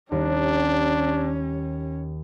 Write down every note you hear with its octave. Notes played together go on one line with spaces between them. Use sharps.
D#2 G3 C#4 D4